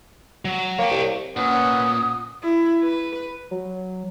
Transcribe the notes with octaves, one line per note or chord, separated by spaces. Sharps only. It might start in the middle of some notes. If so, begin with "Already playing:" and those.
F#3
A#3 C#5 G5
C2
A#2 C#4 B4 F#5 D#6
E4
B4
F#3